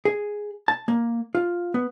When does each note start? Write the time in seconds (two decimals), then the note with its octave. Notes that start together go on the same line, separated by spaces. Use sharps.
0.05 G#4
0.68 A5
0.88 A#3
1.35 F4
1.74 B3